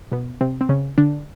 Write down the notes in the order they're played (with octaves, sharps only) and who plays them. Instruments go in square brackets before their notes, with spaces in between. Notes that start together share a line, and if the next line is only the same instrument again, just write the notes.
[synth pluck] B2 B3
C3 C4
C4
C#3 C#4
D3 D4